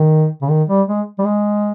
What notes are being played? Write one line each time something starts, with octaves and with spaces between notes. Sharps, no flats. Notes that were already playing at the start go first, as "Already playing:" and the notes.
Already playing: D#3
C#3
D#3
G3
G#3
G3
G#3